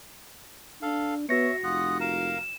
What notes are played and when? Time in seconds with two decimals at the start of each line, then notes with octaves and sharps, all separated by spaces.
0.82 D4 A4 F5
1.29 B3 F#4 C#5 E5 A#6 C#7
1.64 F1 F4 F#5 D#6
2.01 A#4 F5 A#5 E7